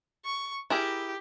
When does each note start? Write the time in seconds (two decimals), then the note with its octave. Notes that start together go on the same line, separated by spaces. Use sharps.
0.25 C#6
0.70 E4 G4 G#4 A#4